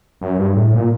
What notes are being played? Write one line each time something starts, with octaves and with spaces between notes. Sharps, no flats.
F#2
G2
A2
A#2